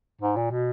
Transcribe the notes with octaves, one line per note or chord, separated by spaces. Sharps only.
G#2
A#2
B2